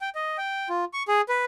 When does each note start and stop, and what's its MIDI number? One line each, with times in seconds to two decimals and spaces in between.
0.01 0.09 79
0.15 0.37 75
0.38 0.69 79
0.69 0.85 65
0.93 1.03 85
1.08 1.21 68
1.29 1.45 71